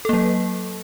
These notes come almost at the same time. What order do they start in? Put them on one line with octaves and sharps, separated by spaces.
A4 A#3 F#3